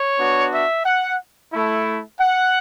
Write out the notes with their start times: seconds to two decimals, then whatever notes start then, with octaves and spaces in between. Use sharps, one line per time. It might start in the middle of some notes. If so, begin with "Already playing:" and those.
Already playing: C#5
0.18 B3 D4 F#4
0.52 E5
0.85 F#5
1.52 A3 E4
2.20 F#5